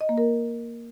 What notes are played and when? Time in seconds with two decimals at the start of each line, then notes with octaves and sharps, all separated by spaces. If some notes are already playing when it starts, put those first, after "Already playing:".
0.01 D#5
0.09 A#3
0.18 A#4